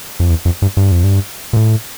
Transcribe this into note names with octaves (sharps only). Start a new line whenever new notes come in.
F2
E2
F2
G2
G2
F2
G2
A#2
A2